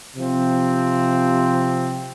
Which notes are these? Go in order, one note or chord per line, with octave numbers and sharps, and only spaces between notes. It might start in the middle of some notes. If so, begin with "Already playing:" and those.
C3 F3 C4